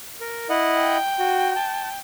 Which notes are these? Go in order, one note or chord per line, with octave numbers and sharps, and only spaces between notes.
A#4
E4 D#5 F#5
G5
F#4
A5